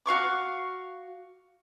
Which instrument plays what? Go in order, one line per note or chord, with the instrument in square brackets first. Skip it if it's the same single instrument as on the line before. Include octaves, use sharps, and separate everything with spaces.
[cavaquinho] F#4 F5 C#6 D6